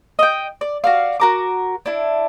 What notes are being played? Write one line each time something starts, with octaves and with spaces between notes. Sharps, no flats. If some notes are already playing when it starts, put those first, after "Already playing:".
D#5 G5
D5
F#4 D5 F5
F#4 A#4 D6
D4 E4